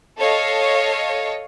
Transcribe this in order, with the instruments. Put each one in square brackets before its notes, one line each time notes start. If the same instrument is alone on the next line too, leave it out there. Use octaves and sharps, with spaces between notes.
[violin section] A4 C#5 D#5 F5